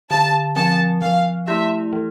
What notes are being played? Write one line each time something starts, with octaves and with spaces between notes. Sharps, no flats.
D3 A5
F3 C4 A5
F3 F5
A3 E4 G4 E5
E3